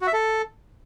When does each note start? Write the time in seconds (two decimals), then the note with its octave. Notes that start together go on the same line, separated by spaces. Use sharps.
0.01 F#4
0.07 E5
0.13 A4